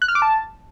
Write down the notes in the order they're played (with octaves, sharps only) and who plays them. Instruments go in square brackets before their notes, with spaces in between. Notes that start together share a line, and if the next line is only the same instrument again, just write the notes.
[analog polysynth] F#6
F6
D6
A5